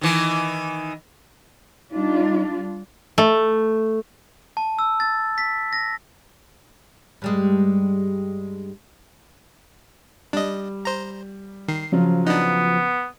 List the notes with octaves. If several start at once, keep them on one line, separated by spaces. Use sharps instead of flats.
D#3 E3
G3 D4 D#4 F4
A3
A5
E6
A6
B6
A#6
G2 G3 G#3
G3 D4 D#5
C5 A#5
D#3 C7
C#3 F3 F#3 F4
B3 D4 D#4